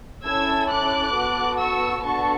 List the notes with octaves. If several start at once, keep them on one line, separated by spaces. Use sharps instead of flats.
C#4 E4 A4 E6 G#6
D6 F#6
B3 F#4 A4
C#6 E6
B3 D4 F#4 A4 A5 C#6